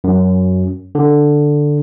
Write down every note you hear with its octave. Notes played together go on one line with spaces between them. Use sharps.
F#2
D3